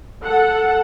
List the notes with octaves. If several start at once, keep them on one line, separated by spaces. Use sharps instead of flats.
A4 F#5